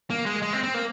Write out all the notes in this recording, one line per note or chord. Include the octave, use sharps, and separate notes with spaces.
A#3
G#3
G#3
C4
C4
A#3